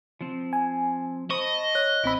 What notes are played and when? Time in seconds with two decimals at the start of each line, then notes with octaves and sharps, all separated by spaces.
0.21 F3 C4
0.53 G#5
1.31 C5 D#5 A5 B5 C#6
1.75 C#5 F#6
2.04 A1 C4 E4 B5 E6